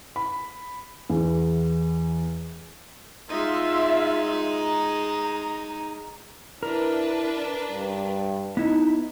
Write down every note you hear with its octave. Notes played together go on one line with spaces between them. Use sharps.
B5
E2
G#3 D#4 F4 E5
A#5
D4 E4 A#4 B4
G2
B3 D#4 E4